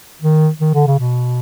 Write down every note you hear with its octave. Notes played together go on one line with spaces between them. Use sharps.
D#3
D#3
D3
C#3
B2